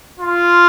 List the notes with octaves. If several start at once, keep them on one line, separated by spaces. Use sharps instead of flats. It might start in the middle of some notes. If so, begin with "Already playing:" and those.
F4